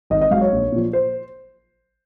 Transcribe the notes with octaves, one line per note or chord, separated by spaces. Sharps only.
G#1 D#5
D#5
G#2 F#3 F5
C#5
A#1
A#2 F3
C5